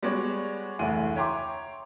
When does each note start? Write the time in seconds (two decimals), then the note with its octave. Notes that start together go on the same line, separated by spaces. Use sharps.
0.03 G3 G#3 B3 F#4 C#5 D5
0.79 F1 D2 E3 G#4 F#5 D#7
1.16 C#5 E5 G5 A#5 C6 D6